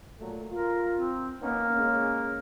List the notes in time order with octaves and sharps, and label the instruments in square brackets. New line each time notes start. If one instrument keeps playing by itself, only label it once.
[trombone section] A#2 F#3 A3
[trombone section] F4 [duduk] A#4
[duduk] C4
[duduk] A#3 [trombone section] B3 C#4 D#4
[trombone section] G#3 C#4